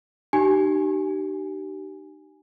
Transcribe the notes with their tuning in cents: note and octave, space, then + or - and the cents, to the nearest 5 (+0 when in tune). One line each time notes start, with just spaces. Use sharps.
D#4 -40 G4 -35 G#5 +0